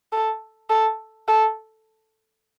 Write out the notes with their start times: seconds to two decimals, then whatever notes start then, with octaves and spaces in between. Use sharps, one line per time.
0.12 A4
0.70 A4
1.28 A4